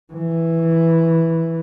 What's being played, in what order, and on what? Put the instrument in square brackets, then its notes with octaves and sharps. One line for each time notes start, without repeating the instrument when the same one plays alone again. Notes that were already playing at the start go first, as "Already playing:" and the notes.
[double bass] E3